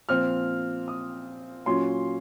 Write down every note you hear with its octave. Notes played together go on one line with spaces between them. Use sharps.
A#2 F3 C4 F6
D#6
A#2 F#3 C#4 C6